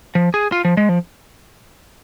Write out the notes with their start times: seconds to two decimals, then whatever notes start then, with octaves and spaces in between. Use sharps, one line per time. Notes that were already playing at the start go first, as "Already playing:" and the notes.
0.15 F3
0.34 G#4
0.52 F4
0.65 F3
0.77 G#3
0.89 F3